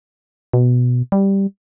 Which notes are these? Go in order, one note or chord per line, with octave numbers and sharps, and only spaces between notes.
B2
G3